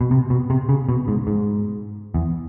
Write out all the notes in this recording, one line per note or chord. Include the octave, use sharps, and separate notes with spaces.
B2
C3
B2
C3
C#3
B2
G#2
G#2
E2